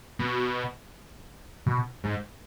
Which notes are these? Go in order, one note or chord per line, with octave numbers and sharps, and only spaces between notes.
B2
B2
G#2